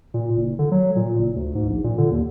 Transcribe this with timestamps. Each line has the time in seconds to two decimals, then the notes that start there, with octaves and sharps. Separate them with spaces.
0.14 A#2
0.37 F#1
0.59 D3
0.72 F#3
0.96 A#2
1.19 F#1
1.36 D2
1.55 G#2
1.69 A#1
1.84 A#2
1.98 D3
2.11 D#2